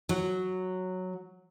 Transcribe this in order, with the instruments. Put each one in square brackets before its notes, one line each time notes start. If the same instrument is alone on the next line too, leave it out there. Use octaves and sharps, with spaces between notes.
[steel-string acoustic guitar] F#3